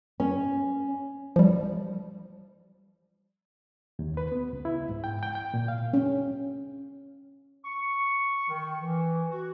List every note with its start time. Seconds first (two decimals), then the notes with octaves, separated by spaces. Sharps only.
0.20 C#4
1.36 F3 G3
3.99 D#2
4.17 B4
4.32 B3
4.53 C#2
4.65 E4
4.89 G#2
5.04 G5
5.23 G5
5.35 G5
5.54 A#2
5.68 F5
5.94 C#4
7.65 C#6
8.49 D#3
8.82 E3
9.30 F#4